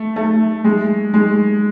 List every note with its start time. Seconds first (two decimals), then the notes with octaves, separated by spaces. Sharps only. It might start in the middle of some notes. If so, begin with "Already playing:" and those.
Already playing: A3
0.16 A3
0.64 G#3
1.14 G#3